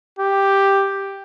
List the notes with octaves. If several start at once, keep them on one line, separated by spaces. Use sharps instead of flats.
G4